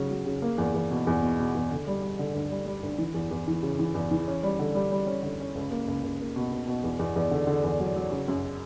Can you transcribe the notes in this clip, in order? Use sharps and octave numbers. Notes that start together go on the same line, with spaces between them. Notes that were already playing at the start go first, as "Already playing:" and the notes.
Already playing: C#3 F#3
F#3
C#3
A#3
E2
E2
B2
E2
B2
B2
E2
D3
G3
G3
D3
D2
G3
G3
D2
E3
E2
E2
E3
C#3
E3
E2
E3
C#4
G3
D3
G3
G3
C#4
D3
C#4
C#2
A#3
C#2
C#2
A#3
B2
B2
B2
E2
E2
E2
D3
D3
E2
F#3
F#3
C#3
F#2